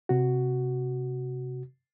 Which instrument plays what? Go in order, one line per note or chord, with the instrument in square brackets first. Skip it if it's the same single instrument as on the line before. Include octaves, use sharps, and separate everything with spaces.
[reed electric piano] C3 F#4